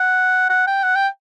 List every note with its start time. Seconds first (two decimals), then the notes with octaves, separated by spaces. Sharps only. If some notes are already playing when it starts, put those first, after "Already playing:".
Already playing: F#5
0.50 F#5
0.67 G5
0.84 F#5
0.96 G5